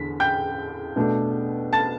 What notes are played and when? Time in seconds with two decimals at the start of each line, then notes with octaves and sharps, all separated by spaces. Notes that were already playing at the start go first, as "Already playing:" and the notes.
Already playing: E2 D3 B6
0.20 G5 G6
0.96 B2 A3 D4
1.73 A5 A6